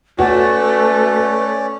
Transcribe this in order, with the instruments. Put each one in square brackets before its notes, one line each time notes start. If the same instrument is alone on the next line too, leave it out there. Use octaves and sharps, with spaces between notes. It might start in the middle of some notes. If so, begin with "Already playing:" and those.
[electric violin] A3 [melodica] C#4 C#5 D5 [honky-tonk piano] F#4 [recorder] B4